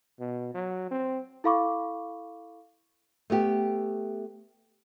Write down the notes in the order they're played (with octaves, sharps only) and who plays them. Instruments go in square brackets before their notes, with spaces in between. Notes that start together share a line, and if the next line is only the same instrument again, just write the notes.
[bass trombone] B2
F#3
C4
[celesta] E4 A4 F5 B5 C#6 D6
[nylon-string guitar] A3 B3 G4